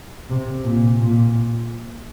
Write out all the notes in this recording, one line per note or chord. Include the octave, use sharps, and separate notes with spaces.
C3
A#2
A#2